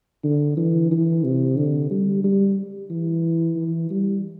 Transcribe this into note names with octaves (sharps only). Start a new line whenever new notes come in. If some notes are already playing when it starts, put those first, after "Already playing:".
D3
E3
E3
C3
D3
G3
G3
E3
E3
G3